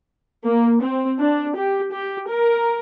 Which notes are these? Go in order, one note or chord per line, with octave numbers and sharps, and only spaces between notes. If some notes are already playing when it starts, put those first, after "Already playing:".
A#3
C4
D4
G4
G4
A#4